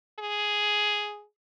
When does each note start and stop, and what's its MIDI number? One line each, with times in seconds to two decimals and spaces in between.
0.19 1.24 68